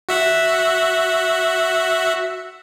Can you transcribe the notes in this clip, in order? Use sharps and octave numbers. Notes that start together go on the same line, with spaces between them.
F#4 E5 F#5